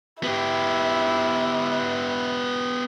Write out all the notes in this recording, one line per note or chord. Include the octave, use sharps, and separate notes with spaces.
B3 E4 G4